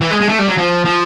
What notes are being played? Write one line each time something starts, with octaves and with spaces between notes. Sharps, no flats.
E3
G#3
G#3
A3
G3
F#3
F3
F3